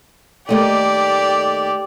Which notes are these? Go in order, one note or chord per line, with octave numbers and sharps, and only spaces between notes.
D#2 A3 G4 D5 D#5